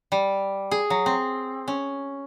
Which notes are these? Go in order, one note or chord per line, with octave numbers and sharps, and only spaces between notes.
G3
G#4
F#3
C4
C#4